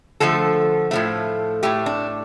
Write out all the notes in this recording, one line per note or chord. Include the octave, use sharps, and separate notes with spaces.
D3 F3 A3 A4
A2 F3 A3
A2 A3 G4
D4